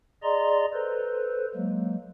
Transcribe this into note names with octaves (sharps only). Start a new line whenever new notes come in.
G#4 D5 D#5 A#5 C6
A4 B4 C5
F#3 G#3 A#3